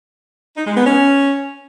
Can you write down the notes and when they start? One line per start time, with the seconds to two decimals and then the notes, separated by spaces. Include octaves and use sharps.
0.57 D#4
0.67 G#3
0.76 B3
0.86 C#4